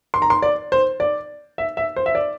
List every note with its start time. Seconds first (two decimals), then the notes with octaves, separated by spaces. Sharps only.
0.14 C6
0.22 A#5
0.30 C6
0.42 D5
0.72 C5
1.00 D5
1.58 E5
1.77 E5
1.96 C5
2.06 E5
2.15 D5